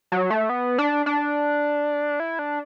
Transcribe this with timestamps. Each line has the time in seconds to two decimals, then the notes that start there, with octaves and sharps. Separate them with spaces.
0.12 F#3
0.30 A3
0.49 B3
0.78 D4
1.06 D4
2.20 E4
2.39 D4